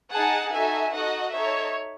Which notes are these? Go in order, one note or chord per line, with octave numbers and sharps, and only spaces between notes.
D#4 G#4 F#5 A5
D#4 F#4 A4 E5 G#5
D#4 F#4 A4 D#5 F#5
D#4 A4 C#5 E5